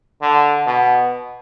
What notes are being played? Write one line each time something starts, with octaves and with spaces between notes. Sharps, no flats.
D3
B2